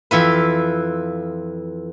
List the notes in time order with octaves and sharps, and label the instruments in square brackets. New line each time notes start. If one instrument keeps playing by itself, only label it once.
[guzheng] F2 E3 F4 B4